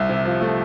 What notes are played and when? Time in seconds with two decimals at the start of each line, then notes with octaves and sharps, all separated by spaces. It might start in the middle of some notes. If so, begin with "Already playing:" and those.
Already playing: C2 E5
0.09 C3
0.25 F3
0.41 A3